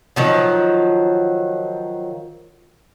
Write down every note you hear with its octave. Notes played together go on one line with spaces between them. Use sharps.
D#3 F3 F#3